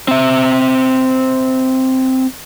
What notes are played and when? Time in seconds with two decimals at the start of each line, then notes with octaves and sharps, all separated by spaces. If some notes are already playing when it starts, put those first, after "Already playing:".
0.08 C4 E5